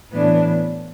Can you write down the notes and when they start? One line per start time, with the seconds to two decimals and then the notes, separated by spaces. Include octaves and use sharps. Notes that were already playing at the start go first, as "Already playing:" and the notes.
0.11 A2 E3 B3 D4